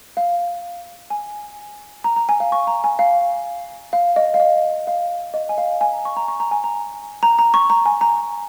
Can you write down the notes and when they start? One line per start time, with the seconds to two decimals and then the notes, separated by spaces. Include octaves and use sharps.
0.17 F5
1.10 G#5
2.04 A#5
2.16 A#5
2.29 G#5
2.40 F5
2.52 C#6
2.67 A#5
2.84 G#5
2.99 F5
3.93 F5
4.16 D#5
4.34 F5
4.40 D#5
4.87 F5
5.34 D#5
5.49 G#5
5.58 F5
5.81 G#5
5.93 A#5
6.05 C#6
6.17 A#5
6.28 C#6
6.40 A#5
6.51 G#5
6.64 A#5
7.23 A#5
7.39 A#5
7.54 C#6
7.70 A#5
7.86 G#5
8.01 A#5